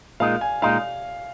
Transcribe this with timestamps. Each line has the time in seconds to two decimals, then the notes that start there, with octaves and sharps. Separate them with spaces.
0.20 A#2 G#3 D#4 F5
0.41 G#5
0.62 A#2 G#3 D#4 F5